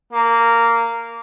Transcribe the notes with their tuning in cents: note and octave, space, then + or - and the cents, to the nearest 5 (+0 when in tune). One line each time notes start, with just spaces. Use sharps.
A#3 -10